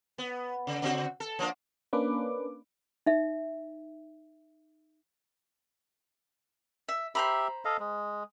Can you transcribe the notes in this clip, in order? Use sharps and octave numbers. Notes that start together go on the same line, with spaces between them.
B3
C#3
C#3 C4 F#4
A4
F3 A#3 D4
A#3 C#4 D4 B4 D6
D#4 E5
E5
G4 C5 E5 A#5 B5
A4 D#5 F5
G#3